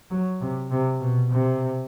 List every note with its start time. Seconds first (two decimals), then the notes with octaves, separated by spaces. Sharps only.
0.11 F#3
0.41 C3
0.71 C3
1.00 B2
1.30 C3